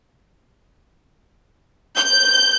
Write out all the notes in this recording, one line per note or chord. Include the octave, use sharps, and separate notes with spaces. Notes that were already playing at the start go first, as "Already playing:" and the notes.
G6